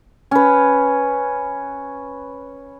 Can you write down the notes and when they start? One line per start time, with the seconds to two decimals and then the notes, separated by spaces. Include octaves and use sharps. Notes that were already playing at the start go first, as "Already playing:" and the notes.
0.31 C#4 B4